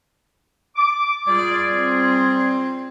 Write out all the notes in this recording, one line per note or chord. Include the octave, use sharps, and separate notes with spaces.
D6
G3 F4 G#4 D5
C4